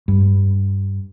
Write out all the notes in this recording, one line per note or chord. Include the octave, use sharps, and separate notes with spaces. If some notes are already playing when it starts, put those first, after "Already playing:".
G2